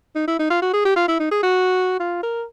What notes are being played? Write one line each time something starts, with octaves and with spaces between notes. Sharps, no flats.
D#4
E4
D#4
F4
F#4
G#4
G4
F4
E4
D#4
G#4
F#4
F4
A#4